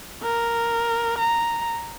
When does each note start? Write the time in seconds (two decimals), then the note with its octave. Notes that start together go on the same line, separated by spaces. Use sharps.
0.23 A#4
1.18 A#5